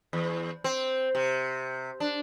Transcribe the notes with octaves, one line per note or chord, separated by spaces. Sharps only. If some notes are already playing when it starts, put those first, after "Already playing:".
E2
C4
C3
D4